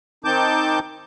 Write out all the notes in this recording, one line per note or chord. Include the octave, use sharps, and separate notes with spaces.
D#3 C4 D#4 A5 D6 G6